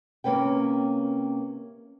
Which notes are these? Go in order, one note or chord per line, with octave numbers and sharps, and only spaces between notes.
C3 A#3 C#4 B4 G5